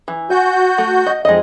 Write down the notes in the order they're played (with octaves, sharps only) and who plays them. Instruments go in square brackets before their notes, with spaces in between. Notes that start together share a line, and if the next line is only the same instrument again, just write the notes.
[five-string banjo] E3
[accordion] F#4 G6 [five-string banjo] G#5
[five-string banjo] A3
D#5
[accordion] F2 [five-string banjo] G#3 D#4 D#5